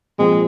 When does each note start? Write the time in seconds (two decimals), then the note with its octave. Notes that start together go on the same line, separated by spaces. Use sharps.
0.18 A#2 F3 G#3 C4 F4